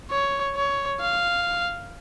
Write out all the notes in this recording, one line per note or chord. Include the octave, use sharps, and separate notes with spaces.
C#5
C#5
F5